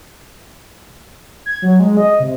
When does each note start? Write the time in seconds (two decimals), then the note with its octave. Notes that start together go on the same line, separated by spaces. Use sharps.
1.46 G#6
1.62 F#3
1.80 G#3
1.97 D#5
2.20 C3